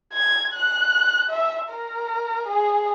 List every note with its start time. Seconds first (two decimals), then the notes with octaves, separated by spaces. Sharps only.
0.13 G#6
0.54 F#6
1.29 E5
1.70 A#4
2.47 G#4